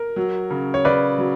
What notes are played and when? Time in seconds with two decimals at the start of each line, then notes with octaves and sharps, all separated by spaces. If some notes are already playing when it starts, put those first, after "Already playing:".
Already playing: A#4
0.16 F#3
0.50 C#3
0.74 C#5
0.85 C#3 B4 D5
1.18 F#3